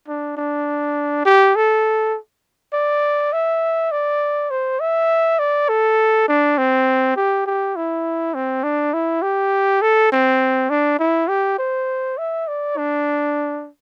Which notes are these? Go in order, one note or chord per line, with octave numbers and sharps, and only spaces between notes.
D4
D4
G4
A4
D5
E5
D5
C5
E5
D5
A4
D4
C4
G4
G4
E4
C4
D4
E4
G4
A4
C4
D4
E4
G4
C5
E5
D5
D4